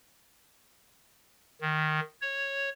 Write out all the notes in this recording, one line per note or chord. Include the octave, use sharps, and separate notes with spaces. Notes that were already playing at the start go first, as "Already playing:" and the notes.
D#3
C#5